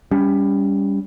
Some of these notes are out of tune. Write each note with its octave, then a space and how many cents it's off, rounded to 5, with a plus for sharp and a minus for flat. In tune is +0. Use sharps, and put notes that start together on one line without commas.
G3 +20 C#4 +30